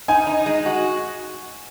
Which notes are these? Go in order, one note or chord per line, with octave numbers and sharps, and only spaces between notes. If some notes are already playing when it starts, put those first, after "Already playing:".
D#4 G#5
D#4
G#3
F#4